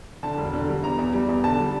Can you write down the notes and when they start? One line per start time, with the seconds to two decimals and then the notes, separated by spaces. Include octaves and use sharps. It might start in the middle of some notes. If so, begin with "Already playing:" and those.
0.23 D3 A5
0.38 E1
0.53 D3
0.69 G3
0.83 E2 A#5
0.99 E2
1.13 G3
1.29 E2
1.44 D3 A5
1.59 G3